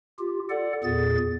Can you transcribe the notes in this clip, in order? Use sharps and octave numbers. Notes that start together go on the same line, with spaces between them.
F4 G4
A4 D5 F#5
E2 A#2 G#4 A6